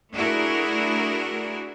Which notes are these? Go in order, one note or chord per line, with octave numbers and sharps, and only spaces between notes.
A3 D4 E4 F#4 G#4 A#4